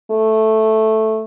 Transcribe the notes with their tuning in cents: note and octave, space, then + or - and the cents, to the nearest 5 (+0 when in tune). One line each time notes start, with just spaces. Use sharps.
A3 -5